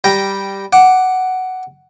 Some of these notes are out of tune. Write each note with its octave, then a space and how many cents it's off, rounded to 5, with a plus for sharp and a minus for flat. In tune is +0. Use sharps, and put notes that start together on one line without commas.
G3 +0 G5 -10 A#5 +0
F#5 +5 D6 -5